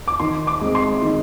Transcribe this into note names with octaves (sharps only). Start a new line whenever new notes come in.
D6
D#3 C6
D6
G#3 C4
C6
D#3